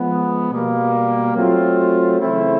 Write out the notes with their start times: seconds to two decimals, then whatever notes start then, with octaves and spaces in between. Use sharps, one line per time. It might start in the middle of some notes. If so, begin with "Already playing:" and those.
Already playing: F3 G#3 B3
0.50 B2 G3 A#3
1.36 F#3 A3 C4 F4
2.20 C#3 E3 A3 C4 E4